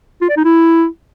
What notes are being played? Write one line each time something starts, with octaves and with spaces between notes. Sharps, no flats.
F4
D5
D#4
E4